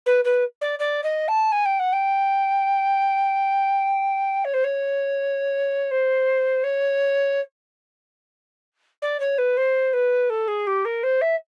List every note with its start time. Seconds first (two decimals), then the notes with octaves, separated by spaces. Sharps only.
0.06 B4
0.25 B4
0.61 D5
0.79 D5
1.04 D#5
1.28 A5
1.52 G#5
1.65 G5
1.79 F#5
1.93 G5
4.45 C#5
4.54 C5
4.64 C#5
5.91 C5
6.64 C#5
9.02 D5
9.20 C#5
9.38 B4
9.57 C5
9.93 B4
10.30 A4
10.48 G#4
10.67 G4
10.85 A#4
11.03 C5
11.21 E5